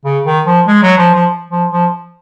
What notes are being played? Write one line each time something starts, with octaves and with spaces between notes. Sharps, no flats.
C#3
D#3
F3
G#3
F#3
F3
F3
F3
F3